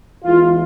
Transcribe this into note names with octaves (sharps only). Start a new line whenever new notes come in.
E2 E3 G#3 F4